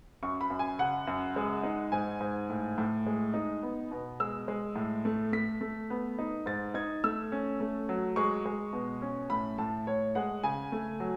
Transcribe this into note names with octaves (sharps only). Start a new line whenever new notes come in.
F#2 C#6
B5
F#2
G#5
C#3 F#5
F#2
G#3
D#4
G#2 G#5
G#2
A2
A2
G#3
D#4
B3
B2
G#3 E6
G#3
A2
A3
A3 B6
A3
B3
D#4
G#2 A6
D#4 G#6
A3 E6
C#4
A3
F#3
G#3 C#6
G#3
B2
C#4
A2 B5
A2 A5
A2 C#5
G#3 F#5
C#3 G#5
A3
F#3